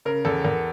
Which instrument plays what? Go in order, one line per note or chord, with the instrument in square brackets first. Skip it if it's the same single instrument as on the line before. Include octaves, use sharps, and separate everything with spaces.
[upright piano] C#3 [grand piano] A#4
[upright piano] E2 [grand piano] A4
[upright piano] E2 [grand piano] A#4